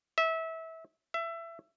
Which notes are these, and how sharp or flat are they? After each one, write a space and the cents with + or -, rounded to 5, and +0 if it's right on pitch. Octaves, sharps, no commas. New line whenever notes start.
E5 -25
E5 +20